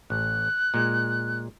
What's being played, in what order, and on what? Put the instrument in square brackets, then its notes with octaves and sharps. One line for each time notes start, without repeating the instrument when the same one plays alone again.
[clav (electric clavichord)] A1 [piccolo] F#6
[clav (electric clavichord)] A#2 G#3